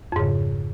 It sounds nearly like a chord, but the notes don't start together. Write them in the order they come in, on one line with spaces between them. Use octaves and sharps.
F2 G#2 C#3